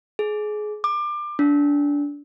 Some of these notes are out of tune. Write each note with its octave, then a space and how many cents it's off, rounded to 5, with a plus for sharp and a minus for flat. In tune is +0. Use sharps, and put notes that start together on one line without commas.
G#4 +25
D6 +25
D4 -20